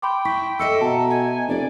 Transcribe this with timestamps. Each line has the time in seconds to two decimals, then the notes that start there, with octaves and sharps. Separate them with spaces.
0.02 G5 B5 C6 D6
0.25 E4 C#6 B6
0.59 A4 D#5 E5 E6 C#7
0.81 B2 A5 A#5
1.10 G#5
1.48 F1 D5